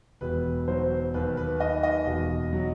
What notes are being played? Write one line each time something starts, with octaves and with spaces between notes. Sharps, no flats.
E1 B4
F#3 C5
D#2 B4
B4
D#3 D#5
D#5
E1
F#3